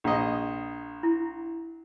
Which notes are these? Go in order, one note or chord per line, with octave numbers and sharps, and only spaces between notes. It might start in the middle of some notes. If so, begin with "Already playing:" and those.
A#1 D#5
E4